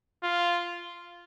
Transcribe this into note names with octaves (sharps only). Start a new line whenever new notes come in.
F4